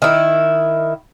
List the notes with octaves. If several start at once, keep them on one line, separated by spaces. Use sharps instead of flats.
D#3 E4